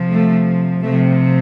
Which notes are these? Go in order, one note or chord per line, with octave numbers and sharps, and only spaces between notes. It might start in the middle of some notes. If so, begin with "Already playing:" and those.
Already playing: C3 F3
A3
C3 F3 A3